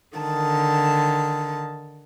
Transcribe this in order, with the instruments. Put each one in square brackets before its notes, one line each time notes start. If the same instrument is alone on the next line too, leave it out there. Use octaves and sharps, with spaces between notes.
[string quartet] D3 D#3 A5